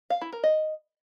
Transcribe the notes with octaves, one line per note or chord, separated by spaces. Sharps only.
F5
E4
A#4
D#5